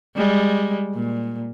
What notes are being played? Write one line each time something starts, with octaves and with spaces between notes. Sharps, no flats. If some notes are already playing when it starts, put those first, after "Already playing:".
G3 G#3
A#2